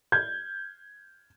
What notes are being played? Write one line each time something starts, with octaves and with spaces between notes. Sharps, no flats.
G6 G#6